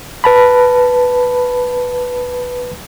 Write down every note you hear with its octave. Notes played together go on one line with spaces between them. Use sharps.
B4 A5 B5